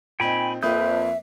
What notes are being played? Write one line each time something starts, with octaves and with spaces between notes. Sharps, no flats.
A#2 C4 D#4 G5 G#5 B5
F2 A#3 B4 E5 D#6 G6